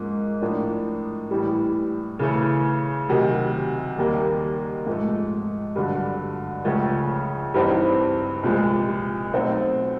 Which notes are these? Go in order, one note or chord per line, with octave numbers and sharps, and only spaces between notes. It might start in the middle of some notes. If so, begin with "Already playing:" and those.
Already playing: G#2 F3 A#3 C#4
A2 F3 A#3 D4
A2 E3 G3
C#3 E3 A3
D2 C3 D#3 F#3
D#2 D#3 G3 A#3
G#2 F3 A3
G2 D3 F#3
C#2 C#3 F3 A3 C#4
G2 E3 G3 C4 D#4
C2 A#2 F3 G#3
B2 F#3 A3 C4 D#4